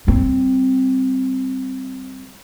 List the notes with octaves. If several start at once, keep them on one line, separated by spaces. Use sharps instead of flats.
G3 C4